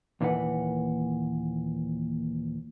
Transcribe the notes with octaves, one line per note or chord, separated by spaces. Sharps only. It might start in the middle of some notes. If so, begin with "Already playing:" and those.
D#2 A#2 E3 B4 F#5